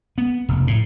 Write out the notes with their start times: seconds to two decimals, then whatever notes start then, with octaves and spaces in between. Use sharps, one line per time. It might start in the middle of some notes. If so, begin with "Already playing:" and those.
0.18 B3
0.49 F1
0.67 A2